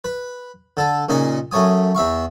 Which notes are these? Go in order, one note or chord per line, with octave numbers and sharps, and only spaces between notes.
B4
D3 A4
A#2 C#3 D#4 D#5 G#5
F#2 A3 C#5 G#5 D#6
E2 E5 F5 C#6